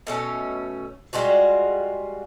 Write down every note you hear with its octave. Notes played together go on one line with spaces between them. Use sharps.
B2 A3 C#4
G3 G#3 F4 F#4